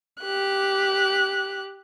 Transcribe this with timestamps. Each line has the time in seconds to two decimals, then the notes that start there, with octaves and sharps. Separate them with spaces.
0.21 G4 F#6